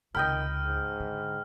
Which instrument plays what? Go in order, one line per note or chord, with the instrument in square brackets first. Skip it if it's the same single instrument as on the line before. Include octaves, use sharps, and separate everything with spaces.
[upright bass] C#2 C3 [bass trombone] D#3 [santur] D#5 G5 B5 [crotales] F6
[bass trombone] G#2
[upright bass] D3